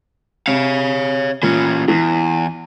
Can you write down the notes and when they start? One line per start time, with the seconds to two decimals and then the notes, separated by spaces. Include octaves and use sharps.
0.47 C3 C#5 F5
1.43 A#2 E3 C#4
1.88 E2 E3